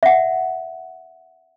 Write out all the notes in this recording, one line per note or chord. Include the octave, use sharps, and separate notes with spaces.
E5 F#5